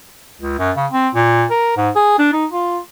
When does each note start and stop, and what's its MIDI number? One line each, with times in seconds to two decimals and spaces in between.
0.41 0.56 37
0.59 0.71 42
0.77 0.86 49
0.92 1.09 60
1.15 1.45 46
1.50 1.73 70
1.77 1.90 44
1.96 2.15 68
2.19 2.33 62
2.33 2.46 63
2.52 2.79 65